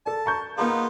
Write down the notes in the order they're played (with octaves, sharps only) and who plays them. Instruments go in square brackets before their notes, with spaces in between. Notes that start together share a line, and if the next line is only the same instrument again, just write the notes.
[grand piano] A4 D5 [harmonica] A5
[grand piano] A#5 C#6 G6
[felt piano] A#3 G#4 [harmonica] B3 D#4 F4